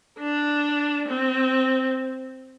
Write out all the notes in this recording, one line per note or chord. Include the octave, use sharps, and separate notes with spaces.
D4
C4